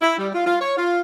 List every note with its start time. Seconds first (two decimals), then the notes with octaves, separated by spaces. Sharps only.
0.02 E4
0.18 G3
0.35 F4
0.46 F4
0.60 C#5
0.76 F4